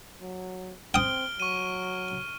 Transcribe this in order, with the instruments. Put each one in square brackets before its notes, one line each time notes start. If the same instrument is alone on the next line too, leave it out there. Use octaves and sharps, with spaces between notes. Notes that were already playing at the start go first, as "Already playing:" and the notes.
[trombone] F#3
[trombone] C4 [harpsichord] G5 D#6 [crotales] F6 D7 G7
[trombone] F#3 [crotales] C#6 D#7